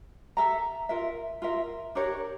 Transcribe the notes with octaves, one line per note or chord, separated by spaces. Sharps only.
A4 E5 A#5
F4 A#4 E5
F4 A#4 E5
D4 G4 A#4 C#5